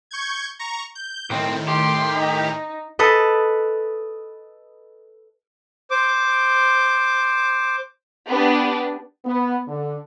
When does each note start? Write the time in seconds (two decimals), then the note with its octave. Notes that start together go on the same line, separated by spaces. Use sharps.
0.11 C#6 G6 G#6
0.59 A#5 C#6
0.95 G6
1.30 B1 A2 D#3 C4
1.68 G4 C6
2.18 D#4
2.99 A4 B4 D#5
5.91 C5 D6
8.30 B3 D4 G4 B4
9.25 B3
9.68 D3